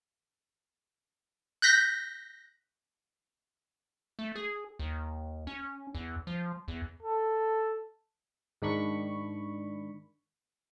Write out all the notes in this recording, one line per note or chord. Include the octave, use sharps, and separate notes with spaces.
F#6 G6 A#6 B6
A3
G#4
D#2
C#4
E2
F3
E2
A4
G#2 D#3 D4 B5 C#6